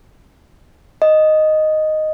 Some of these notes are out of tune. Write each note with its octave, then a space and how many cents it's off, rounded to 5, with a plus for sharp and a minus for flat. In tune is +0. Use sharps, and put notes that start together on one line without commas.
D#5 -5